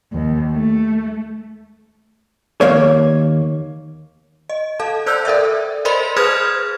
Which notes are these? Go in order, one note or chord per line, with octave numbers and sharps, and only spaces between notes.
D#2
A3
D#2 A#3 C#5
D#5
A4 F5 A5
A4 C5 D5 E6 F#6 G6
A4 A#4 D5 E5
A#4 C5 D5 D#5 B5 C6
G#4 B4 C5 D#6 F6 G#6